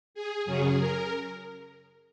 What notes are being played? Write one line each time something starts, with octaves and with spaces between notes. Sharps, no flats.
G#4
F#2 C#3 F#3 C#4 G#4
A#4